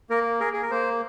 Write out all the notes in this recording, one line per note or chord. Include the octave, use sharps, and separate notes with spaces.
A#3 A#4
G#4 A#4
G#4
A#4
A#3 C5